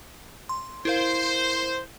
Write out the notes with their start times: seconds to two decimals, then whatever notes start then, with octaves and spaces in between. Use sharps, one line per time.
0.49 C6
0.85 E4 A#4 C5 F5